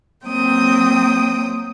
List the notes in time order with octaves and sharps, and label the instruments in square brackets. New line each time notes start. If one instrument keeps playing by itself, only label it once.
[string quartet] F#3 A#3 C4 G5 D#6